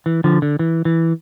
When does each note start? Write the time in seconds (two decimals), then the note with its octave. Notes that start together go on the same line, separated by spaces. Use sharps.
0.06 E3
0.24 D3 F3
0.42 D3
0.59 E3
0.85 E3